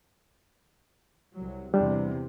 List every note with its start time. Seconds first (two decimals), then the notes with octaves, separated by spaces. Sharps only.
1.34 C2 F#3
1.74 E2 C3 G3 D4